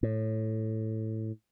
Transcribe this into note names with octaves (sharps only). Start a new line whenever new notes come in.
A2